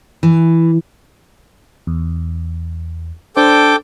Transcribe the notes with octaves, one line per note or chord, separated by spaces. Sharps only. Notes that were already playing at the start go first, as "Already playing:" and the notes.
E3
E2
D4 A4 C5 G5 D6